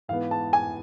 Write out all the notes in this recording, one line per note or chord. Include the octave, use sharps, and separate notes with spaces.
G#2 E3 B3 F5
A5
G#5